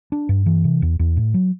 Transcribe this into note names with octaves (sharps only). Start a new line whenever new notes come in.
D4
G2
E3
C3
E2
E2
A2
F#3